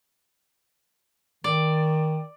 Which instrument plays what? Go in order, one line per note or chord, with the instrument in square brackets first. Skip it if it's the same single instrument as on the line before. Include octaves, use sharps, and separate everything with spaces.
[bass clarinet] D#3 [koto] D5